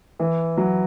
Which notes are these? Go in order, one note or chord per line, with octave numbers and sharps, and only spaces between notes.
E3
F#3